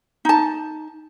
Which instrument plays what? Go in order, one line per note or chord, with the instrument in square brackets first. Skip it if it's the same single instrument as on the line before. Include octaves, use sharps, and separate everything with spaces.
[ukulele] D#4 A5